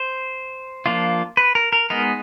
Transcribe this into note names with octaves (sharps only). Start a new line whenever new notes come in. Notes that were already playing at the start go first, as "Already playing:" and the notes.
Already playing: C5
F3 A#3 D4 F4
B4
A#4
A#4
G#3 B3 D#4 A#4